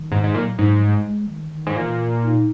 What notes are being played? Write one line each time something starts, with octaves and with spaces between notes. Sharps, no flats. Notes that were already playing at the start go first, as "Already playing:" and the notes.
Already playing: D#3
G#2
G#2
A#2 F#3
G#2
G#3
G#3
D#3
D#3
G#2
A#2 E3
D#4